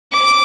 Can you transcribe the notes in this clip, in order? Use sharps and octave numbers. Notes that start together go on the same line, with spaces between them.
D6